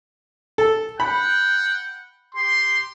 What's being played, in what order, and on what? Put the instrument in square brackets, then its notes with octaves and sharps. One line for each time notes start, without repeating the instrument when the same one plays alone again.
[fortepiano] A4
[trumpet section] F#5 G5 [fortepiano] B5
[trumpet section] G4 C6